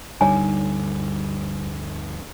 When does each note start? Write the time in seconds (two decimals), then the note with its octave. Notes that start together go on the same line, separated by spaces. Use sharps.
0.21 D2 G2 D3 G3 D#4 C#5 G#5